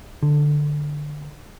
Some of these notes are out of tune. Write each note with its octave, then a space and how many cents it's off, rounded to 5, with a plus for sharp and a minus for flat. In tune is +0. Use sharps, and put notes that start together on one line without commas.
D3 +10